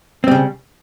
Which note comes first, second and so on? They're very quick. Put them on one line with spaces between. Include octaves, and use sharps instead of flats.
C4 G3 C#3